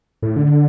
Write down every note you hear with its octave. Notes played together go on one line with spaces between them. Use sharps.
A2
D3